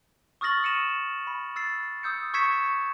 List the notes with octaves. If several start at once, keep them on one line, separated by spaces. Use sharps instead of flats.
C#6 D#6 F6 A6 A#6 F#7
E6 F6 C#7 D#7 E7
B5
E6 A6 C7
D#6 E6 G6 C#7
C#6 E6 G#6 B6 C#7 E7